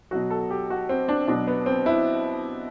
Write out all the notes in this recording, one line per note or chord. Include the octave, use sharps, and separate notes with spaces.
B2 F#3 F#4
A4
G4
F#4
C4
D4
B2 F#3 D4
B3
C4
E4